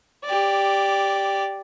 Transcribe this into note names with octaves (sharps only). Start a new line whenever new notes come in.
G4 D5